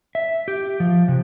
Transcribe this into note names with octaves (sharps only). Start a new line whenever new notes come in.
E5
G4
F3
C3